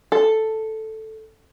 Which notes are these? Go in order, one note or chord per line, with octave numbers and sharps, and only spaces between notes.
A4